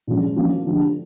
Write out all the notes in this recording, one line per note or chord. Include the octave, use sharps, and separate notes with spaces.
A#2 F3 G#3 C#4 F4
F3 A#3 C#4 F#4
D3 F3 A3 D4 G4